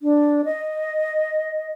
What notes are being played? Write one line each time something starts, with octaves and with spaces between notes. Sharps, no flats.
D4
D#5